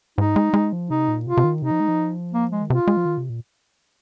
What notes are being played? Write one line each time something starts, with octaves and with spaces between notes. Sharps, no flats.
G#2 D#4
G#3
G#3
F3
C3 D#4
A#2
C3 F4
C3
D#3
C3 D#4
F3
G#3
F3
A#3
G#3
D#3
C3 F4
G#3
F3
D#3
C3
A#2